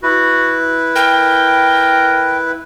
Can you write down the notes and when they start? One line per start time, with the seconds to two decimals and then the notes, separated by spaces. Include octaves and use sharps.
0.03 E4 F#4 B4
0.96 A#4 G5